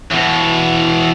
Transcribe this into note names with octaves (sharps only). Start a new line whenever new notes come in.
E2 B2